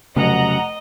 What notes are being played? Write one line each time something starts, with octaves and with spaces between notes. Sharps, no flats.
F1 C#3 F#3 D#5 F#5 A#5